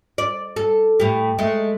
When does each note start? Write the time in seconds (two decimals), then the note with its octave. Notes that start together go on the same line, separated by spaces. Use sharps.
0.18 D5
0.56 A4
1.00 A2 G4
1.38 G#3 A3